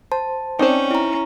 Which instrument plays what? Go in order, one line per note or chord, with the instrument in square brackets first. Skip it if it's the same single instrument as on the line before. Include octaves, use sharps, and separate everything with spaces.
[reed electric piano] C5 [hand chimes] A5
[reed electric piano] C4 D5 G5 [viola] C#4 [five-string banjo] D#4 C5
[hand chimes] E4 A#5